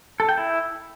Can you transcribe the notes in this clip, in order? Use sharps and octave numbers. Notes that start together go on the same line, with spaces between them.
A4
G5
E4